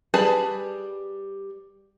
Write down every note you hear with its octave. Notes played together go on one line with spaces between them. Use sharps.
G3 G#4 B4 A5